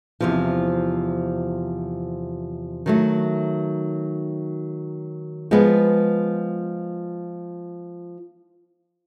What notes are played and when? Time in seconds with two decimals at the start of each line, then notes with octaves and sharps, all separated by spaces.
0.21 E2 C3 F3
2.86 D#3 F#3 A3
5.51 F3 G#3 B3